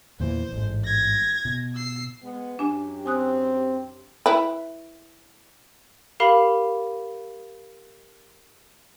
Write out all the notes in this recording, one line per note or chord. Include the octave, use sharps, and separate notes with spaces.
E2 A#2 E3 C5
A1 G#2
G#6 A#6
B2
E6 C7
G#3 B3
F#2 D4 G4 G#5
C4 G#5 D#6 F#6
E4 B4
G4 A#4 F5 B5